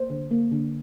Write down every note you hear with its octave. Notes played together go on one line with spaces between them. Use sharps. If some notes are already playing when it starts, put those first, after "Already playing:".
Already playing: A#3 C5
D3
A#3
D3